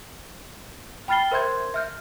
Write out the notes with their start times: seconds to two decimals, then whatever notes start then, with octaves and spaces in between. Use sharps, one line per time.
1.08 G5 B5 F6 A6 C7 G7
1.31 A#4 C5 E5 C6 G6 G#6
1.74 E5 F6 G6